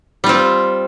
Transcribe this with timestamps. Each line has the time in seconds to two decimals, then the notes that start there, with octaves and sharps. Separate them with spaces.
0.24 G3
0.26 F4
0.29 C4